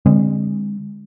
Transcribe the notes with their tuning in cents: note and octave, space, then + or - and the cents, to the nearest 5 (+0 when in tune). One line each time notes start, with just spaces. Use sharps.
D3 -5 G#3 -35 C4 +0